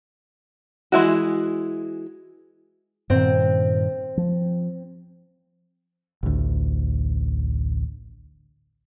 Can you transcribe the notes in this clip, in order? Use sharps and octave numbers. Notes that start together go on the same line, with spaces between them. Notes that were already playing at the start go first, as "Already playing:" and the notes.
E3 G#3 E4 F#4
G2 A#2 D#3 C4
F3
A1 D2